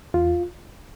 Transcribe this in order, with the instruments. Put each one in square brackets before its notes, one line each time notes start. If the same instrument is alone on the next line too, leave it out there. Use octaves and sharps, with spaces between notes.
[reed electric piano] E2 F4